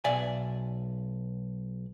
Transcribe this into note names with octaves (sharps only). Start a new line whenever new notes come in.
B1 D5 E5 G#5